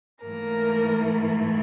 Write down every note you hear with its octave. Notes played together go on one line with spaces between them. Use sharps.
G#2 E3 A3 A#3 A#4